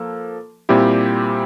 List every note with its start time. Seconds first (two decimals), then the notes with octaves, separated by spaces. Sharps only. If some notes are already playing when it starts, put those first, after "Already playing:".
Already playing: F3 A#3 A4
0.69 A#2 G3 C4 E4 G4